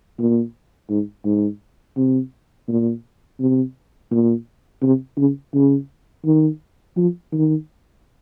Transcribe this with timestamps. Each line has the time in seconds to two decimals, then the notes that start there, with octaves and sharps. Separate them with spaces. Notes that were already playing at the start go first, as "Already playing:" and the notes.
0.19 A#2
0.90 G#2
1.25 G#2
1.97 C3
2.68 A#2
3.40 C3
4.11 A#2
4.83 C3
5.18 C#3
5.54 C#3
6.26 D#3
6.97 F3
7.32 D#3